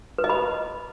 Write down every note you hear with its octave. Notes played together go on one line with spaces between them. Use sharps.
B4
D#5
B5